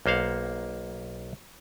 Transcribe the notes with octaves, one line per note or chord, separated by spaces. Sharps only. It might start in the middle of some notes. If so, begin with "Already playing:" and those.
B1 A#3 C5 F5 F#5